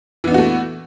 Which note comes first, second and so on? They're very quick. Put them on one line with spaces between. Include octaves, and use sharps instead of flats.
E3 B3 D4 F#4 A3